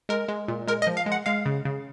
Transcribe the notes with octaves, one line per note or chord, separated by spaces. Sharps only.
G#3 A#4
G#3
A#2
G#3 A#4
D#5
F3
F5
G#3
F#5
G#3 F5
C#3
C#3